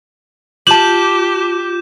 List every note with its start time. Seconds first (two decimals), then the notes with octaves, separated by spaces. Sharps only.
0.67 F4 G4 A5 D6 G6 E7 F#7